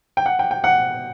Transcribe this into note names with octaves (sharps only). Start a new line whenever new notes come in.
G5
F#5
G5
G5
F#5